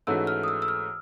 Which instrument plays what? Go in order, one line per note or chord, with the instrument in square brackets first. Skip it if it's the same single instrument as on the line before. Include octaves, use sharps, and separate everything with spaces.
[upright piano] G#2 E3 A3 C#4 F#4 [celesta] E6
[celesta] F6
D#6
E6
E6
F6